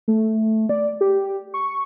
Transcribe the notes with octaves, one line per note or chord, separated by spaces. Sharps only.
A3
D5
G4
C#6